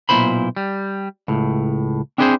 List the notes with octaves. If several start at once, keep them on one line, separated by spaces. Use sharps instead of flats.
B1 E2 A#2 E4 C5 B5
G3
C#2 A2
C4 D4 E4 G#4 B4 C5